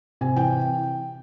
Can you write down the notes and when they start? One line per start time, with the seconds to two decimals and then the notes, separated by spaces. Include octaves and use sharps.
0.21 C3 G#5
0.36 E3 G5